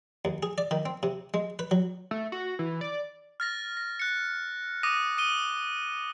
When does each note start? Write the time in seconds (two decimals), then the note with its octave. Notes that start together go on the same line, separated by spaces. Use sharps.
0.25 D#2
0.43 G#4
0.58 D5
0.71 D#3
0.86 C4
1.03 C3
1.34 G#3
1.59 B4
1.71 F#3
2.11 A3
2.32 F#4
2.59 E3
2.81 D5
3.40 F6 A6 A#6
3.77 A#6
4.00 F#6 C#7
4.83 D6 D#6 A#6 D#7
5.18 D#6 D#7 G7